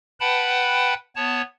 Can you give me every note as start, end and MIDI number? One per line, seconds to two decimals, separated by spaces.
0.20 0.94 71
0.20 0.94 78
0.20 0.94 79
0.20 0.94 81
0.20 0.94 83
1.16 1.42 59
1.16 1.42 73
1.16 1.42 81